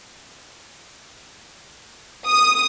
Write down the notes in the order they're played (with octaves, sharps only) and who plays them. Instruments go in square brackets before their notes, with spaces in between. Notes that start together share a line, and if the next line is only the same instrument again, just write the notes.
[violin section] D#6